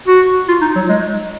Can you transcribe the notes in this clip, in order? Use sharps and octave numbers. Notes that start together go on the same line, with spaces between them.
F#4
F4
D#4
F#3
G#3